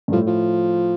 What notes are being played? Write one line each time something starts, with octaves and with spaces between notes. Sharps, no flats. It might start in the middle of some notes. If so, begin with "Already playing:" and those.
G2
A2 F3
F3